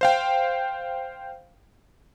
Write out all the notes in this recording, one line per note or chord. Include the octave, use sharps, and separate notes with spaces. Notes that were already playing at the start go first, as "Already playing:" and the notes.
C5 F5 G5